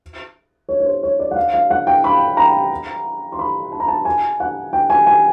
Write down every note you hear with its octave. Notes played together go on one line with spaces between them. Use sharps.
C#5
C#5
C5
C#5
D5
F#5
F5
F5
F#5
G5
B5
A#5
C6
B5
A5
A#5
A5
G#5
F#5
G5
G#5
G#5